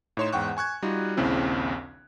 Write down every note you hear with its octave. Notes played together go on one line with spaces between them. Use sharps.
A2 D#4 C#5 C6 E7
E2 G#2 F#5 G5 C#6 F#6
G#5 C#6 F#6 G#6
G3 D#4 F4 F#4
A#1 D#2 C#3 C4 E4